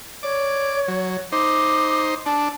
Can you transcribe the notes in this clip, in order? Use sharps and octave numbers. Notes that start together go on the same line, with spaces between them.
C#5 D5
F#3
D#4 C5 D6
D4 A5